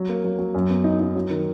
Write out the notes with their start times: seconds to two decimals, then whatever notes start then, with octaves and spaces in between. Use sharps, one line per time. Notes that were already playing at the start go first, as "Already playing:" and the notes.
Already playing: F#3
0.09 A#3
0.24 F#3
0.39 F#3
0.54 F#2
0.70 B3
0.84 D#4
1.00 D#4
1.15 F#3
1.30 D#3